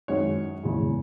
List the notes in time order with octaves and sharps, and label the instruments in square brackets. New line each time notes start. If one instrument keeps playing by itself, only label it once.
[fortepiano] F#2 D#3 G#3 C#5
E2 C#3 E3 G#3